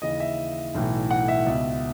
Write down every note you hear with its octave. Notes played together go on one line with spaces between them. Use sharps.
D#2 C#3 E3 D#5
E5
B1 A2 E3
F#5
E5
C#2 B2